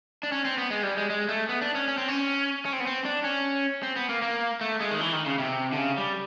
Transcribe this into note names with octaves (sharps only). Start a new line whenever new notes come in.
D4
C#4
C4
B3
G#3
G3
G#3
G#3
A3
B3
D4
C#4
C#4
C4
C#4
C#4
C4
B3
C4
D4
C#4
C4
B3
A#3
A#3
A3
G#3
D#3
E3
D#3
C#3
C3
D3
C#3
G3